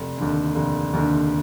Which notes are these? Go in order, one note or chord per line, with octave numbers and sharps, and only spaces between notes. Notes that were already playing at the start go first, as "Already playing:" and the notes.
Already playing: F1
D#2 D3
F1
D#2 D3